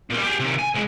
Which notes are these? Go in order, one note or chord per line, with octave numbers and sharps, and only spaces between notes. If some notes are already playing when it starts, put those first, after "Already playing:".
A#2 G3
G4 G#4
C3 D#3
G#5
C2 G#3